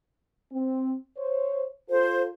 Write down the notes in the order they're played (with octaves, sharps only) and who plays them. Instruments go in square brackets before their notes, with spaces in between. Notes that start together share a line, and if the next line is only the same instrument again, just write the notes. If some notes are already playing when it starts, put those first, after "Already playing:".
[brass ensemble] C4
C5 C#5
[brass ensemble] F4 A4 [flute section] C5